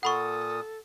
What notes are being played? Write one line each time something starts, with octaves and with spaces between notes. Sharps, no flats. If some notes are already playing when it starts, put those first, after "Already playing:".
A#2 A4 F#5 B5 C#6 D#6